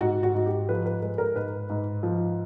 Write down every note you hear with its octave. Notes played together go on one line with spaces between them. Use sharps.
G#2 F#4
F#4
G#2
G4
F3 B4
B4
G#3 B4
A#4
G#2 B4
G#2
F3